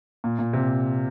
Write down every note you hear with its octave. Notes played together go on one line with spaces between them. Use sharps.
A#2
A#2
C3